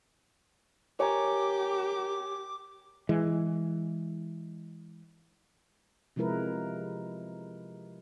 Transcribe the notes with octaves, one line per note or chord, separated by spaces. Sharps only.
G4 A#4 C#5 G#5 A#5 D6
E3 G#3
C3 F3 G#3 E4 A#4 B4